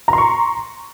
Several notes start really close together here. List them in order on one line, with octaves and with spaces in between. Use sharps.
A#5 C6 C#6